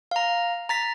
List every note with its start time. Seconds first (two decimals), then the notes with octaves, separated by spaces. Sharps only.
0.11 F5 A#5
0.69 A#5 A6 B6